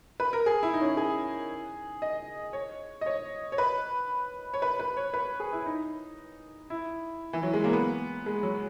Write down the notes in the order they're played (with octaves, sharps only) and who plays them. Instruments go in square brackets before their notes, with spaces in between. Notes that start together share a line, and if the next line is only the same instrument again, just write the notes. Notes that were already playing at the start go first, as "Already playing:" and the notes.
[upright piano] B4
A#4
G#4
E4
D#4
C#4
G#4
D#5
C#5
D#5
C#5
C#5
B4
C#5
B4
B4
C#5
B4
G#4
E4
D#4
E4
E3
F#3
G#3
A#3
B3
G#3
F#3